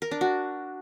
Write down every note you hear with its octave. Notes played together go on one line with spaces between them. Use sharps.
A#4
D4
F#4